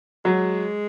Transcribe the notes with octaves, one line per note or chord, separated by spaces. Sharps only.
F#3 G#3